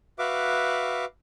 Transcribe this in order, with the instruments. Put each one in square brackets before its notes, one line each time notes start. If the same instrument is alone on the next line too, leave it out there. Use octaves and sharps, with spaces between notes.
[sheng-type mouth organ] F#4 B4 E5 F5 D6